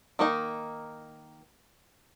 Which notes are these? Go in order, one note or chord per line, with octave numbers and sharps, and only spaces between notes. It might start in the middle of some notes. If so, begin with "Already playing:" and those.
D#3 A#3 D#4